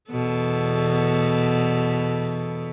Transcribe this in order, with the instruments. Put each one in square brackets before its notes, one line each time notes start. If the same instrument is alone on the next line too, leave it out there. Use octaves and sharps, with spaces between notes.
[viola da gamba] E2 B2 A4